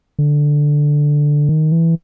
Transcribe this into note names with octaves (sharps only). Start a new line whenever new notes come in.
D3
D#3
E3